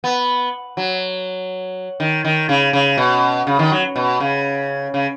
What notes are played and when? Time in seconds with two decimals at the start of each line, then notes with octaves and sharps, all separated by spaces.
0.04 B3
0.77 F#3
2.00 D#3
2.25 D#3
2.49 C#3
2.73 C#3
2.98 B2
3.47 C#3
3.59 D#3
3.72 F#3
3.96 B2
4.20 C#3
4.94 C#3